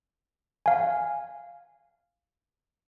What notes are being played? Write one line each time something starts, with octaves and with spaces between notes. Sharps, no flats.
F5 G#5